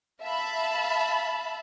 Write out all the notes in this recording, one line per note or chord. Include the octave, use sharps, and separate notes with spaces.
E5 F5 A5 B5